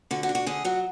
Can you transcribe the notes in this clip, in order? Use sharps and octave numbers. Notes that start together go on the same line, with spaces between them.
D3 F#4
F#4
D4
F#4
D3 G#4
F#3 F#4